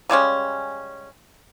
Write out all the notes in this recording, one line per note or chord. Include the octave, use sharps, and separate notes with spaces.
C#3 G3 G#3 C#4